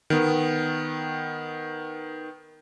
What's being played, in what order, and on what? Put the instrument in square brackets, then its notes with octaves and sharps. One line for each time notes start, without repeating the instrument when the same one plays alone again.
[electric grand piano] D#3 B3